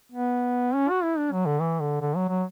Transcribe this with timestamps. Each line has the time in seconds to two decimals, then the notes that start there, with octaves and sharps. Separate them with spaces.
0.12 B3
0.74 C#4
0.90 F#4
1.03 E4
1.18 D4
1.32 F#3
1.46 D3
1.60 E3
1.80 D3
2.01 D3
2.16 F#3
2.29 F#3